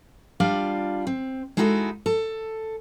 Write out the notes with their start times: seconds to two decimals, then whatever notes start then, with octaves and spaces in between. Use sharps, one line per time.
0.40 G3 D4 F4 D5 F5
1.07 C4
1.57 G#3 D#4 E4 F#4 G#4 A4
2.06 A4